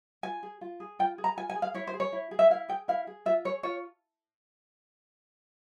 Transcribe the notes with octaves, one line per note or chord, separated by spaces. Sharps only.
F4 G#5
G#4
F4
G#4
F4 G5
G#4
A#5
F4 G#5
G#5
G#4
F5
E4 C#5
C5
G#4
C#5
E4
G#4
E5
E4 F5
G#4 G5
E4 F5
G#4
F4 E5
G#4 C#5
F4 C#5